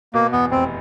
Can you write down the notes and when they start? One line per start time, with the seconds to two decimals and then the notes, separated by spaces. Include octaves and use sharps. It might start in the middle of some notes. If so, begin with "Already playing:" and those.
0.14 B2 A#3
0.32 E2 B3
0.51 F1 C4